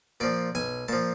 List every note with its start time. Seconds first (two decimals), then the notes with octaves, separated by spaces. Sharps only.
0.20 A#2 F3 D5
0.55 B1 G#5
0.88 A#2 F3 A5